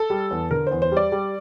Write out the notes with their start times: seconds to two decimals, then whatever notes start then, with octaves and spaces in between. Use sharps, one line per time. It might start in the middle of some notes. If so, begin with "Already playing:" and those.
Already playing: A4
0.10 G3
0.31 E2
0.51 D3 A#4
0.67 E2 C5
0.82 C5
0.92 G3 D5
1.12 G3